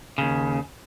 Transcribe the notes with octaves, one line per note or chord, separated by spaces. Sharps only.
D#2 C#3